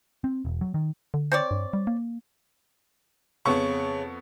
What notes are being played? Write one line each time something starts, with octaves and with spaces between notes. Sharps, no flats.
C4
E1
F#3
D#3
D3
C4 C#5 D5
G2
G3
A#3
F2 C#3 B3 C#6